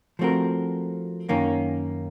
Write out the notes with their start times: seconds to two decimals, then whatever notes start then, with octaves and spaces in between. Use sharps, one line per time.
0.19 F3 A3 C4 F#4 A#4
1.29 F#2 D#3 A#3 C#4